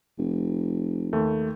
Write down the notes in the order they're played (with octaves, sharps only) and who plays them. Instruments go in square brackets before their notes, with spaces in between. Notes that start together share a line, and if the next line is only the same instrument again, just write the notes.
[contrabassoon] F1
[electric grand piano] D#2 A3